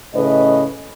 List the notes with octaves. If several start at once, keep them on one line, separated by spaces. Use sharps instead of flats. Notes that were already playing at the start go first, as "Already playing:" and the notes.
A2 C#3 B4 D#5